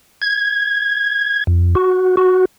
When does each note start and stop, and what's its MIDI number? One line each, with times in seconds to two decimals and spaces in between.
0.22 1.44 92
1.47 1.75 41
1.75 2.15 66
2.17 2.45 66